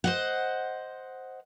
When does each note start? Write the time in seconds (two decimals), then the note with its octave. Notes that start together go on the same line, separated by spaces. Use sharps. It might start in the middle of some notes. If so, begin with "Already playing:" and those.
0.04 C5 D#5 F#5